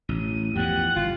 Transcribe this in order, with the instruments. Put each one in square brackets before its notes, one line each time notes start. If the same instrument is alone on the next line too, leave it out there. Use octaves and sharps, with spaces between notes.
[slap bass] A1 [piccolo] D#7
[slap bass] E2 G2 F3 [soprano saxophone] G4 [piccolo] F#5
[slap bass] G1 [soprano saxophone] F4